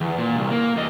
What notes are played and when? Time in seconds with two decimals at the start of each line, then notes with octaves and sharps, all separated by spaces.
0.01 E2
0.18 A#2
0.36 C2
0.51 A#3
0.76 E2 D#5